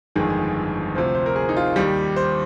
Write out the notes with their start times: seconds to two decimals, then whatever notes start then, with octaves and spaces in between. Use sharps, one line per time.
0.16 G1 F2 D#3 G#3 G#4
0.95 D2 C3 F3 C5
1.15 C5
1.26 A#4
1.36 G#4
1.49 D#4
1.57 F4
1.76 D#2 D#3 G3 G4
2.16 C5